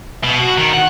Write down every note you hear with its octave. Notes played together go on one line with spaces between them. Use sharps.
B2
F#4
D#3
F#5